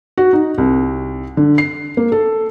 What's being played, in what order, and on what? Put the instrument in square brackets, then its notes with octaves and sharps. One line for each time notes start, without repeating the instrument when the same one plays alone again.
[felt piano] F#4
D#4
C2
D3
C7
A#3
A4